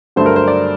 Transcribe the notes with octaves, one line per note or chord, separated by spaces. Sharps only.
G2 D3 F#3 A3 C5
A#4
C5
D5